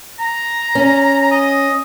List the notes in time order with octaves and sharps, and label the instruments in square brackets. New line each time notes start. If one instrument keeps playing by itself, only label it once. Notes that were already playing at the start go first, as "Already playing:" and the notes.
[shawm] A#5
[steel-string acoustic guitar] C#4
[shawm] D#5